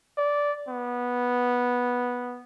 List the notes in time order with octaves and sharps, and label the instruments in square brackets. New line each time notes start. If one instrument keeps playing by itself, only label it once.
[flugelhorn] D5
B3